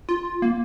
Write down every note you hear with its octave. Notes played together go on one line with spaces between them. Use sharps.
F4
A#3